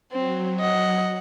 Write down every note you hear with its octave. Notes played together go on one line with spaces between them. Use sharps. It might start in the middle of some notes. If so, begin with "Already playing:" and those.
F#3 C4
D#5 F#5